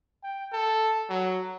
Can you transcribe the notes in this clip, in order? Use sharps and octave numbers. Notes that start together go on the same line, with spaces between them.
G5
A4
F#3